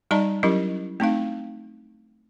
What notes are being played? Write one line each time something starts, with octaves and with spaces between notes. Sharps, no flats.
G3 D#4 D5 D#5 A5 A#5
F#3 C#4 E4 G4 A#4 D#5
A3 C4 D#4 F5